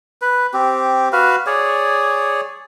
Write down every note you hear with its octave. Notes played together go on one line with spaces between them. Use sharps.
B4
C4 G4
F#4 B4 F5
G#4 C#5 D5